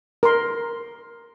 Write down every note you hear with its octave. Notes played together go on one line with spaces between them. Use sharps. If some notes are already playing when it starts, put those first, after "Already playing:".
A#4 C6